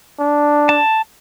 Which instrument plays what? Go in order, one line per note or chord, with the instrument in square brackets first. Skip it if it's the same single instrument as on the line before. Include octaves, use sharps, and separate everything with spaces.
[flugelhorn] D4
[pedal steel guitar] A5